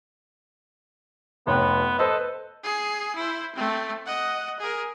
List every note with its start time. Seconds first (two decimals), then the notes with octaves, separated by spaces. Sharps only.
1.47 F1 B3 C#5 G5
1.99 A4 B4 C5 D#5
2.64 G#4 C7
3.16 E4 C5
3.55 A3 C4
4.06 D#5 F#5
4.60 G#4 A#4